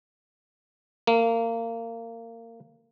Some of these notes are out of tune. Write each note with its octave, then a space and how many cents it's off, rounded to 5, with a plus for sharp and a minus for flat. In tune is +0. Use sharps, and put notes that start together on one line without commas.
A#3 -25